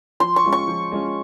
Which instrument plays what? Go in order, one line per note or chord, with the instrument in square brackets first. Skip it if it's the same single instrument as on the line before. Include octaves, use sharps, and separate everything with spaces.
[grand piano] F3 [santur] C6
[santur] C#6
[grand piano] G#3 C#4 F4
[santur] C#6
[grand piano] F3
G#3 C#4 F4